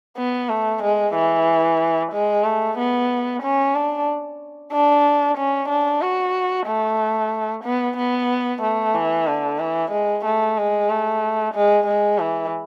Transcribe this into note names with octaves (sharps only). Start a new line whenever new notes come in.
B3
A3
G#3
E3
G#3
A3
B3
C#4
D4
D4
C#4
D4
F#4
A3
B3
B3
A3
E3
D3
E3
G#3
A3
G#3
A3
G#3
G#3
E3